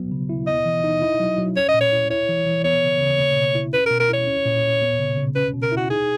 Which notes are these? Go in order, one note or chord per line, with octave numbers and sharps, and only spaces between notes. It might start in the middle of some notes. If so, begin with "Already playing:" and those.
Already playing: F#3 B3
C#3
E4
B3 D#5
E3
D#4
E4
F#3
F#3
C#4 C#5
D#5
A#2
C#5
E4
E4 C#5
E3
E3
B3 C#5
C#3
C#3
A#3
B2
E4
C#4 B4
B2 A#4
A#4
E4 C#5
C#4
A#2
A#2
B3
C#3
C#3
C#4 B4
B2
A#4
E4 F#4
D#4 G#4